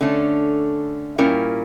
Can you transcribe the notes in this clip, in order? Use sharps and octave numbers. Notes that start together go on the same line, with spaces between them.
D3 A3 C#4
A#2 G3 C#4 E4 A#4